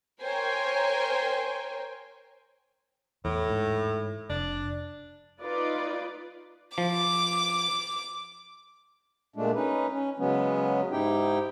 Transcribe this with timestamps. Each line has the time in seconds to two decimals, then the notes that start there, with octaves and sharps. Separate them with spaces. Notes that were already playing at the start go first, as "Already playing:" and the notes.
0.22 A#4 C5 C#5 G5 G#5
3.25 E2 A2
3.50 G#2
4.30 F1 D4
5.42 D#4 F4 B4 D5
6.78 F3 D6
9.36 A#2 G#3 A3 D4
9.54 C#4 D#4 B4
9.92 C#4
10.19 C#3 F#3 G#3 B3 C#4
10.92 G#2 D#4 E4 G4 G5